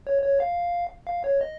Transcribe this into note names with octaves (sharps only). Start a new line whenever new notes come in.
C#5
C#5
F5
F5
C#5
D#5